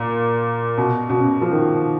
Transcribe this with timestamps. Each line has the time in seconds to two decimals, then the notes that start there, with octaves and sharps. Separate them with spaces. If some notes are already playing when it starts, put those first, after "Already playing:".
Already playing: A#2
0.78 B2
1.09 B2
1.15 C#3
1.41 F3
1.51 D#3